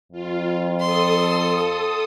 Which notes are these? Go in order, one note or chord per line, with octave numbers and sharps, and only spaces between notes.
F2 F4
A4 C6 D#6